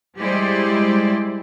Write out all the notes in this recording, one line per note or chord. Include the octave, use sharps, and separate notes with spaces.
G3 G#3 E4 G4 C5 D5